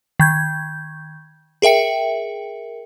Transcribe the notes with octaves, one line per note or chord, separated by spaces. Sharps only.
D#3 G6 G#6
G#4 A#4 E5 G5 C#7